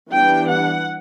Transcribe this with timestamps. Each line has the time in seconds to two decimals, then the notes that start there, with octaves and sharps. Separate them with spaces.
0.12 E3 G3 B3 D4 G5
0.49 F#5